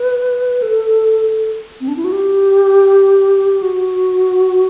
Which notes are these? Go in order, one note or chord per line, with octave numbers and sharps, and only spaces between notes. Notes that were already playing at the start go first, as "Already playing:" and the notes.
Already playing: B4
A4
C4
D4
E4
F#4
G4
F#4